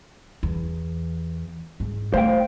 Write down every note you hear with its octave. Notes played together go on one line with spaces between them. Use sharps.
E2
G#2
A3 C5 F5 G5